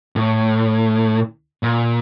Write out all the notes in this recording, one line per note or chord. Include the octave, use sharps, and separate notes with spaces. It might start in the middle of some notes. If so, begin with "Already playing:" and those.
A2
A#2